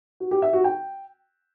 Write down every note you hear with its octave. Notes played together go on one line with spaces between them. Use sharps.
F#4
G4
E5
F#4
G5